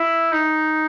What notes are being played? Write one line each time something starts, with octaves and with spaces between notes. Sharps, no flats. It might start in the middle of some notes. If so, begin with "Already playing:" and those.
Already playing: E4
D#4